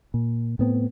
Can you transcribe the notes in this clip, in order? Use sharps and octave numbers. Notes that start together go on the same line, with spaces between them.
A#2
A2 B3 C4